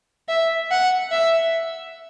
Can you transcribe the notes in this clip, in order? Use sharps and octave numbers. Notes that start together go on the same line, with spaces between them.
E5
F#5
E5